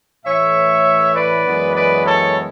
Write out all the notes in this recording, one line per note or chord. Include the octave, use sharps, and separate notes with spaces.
A2 E3 A3 C#5 E5
B4 D5
F#2 E3 G#3 B3
B4 D5
A4 C#5